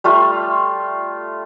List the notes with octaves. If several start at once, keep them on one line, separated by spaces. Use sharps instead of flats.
G3 A3 F4